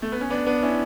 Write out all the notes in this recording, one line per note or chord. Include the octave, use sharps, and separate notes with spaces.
A3
B3
C#4
B3 D4
B3 D4
C#4 E4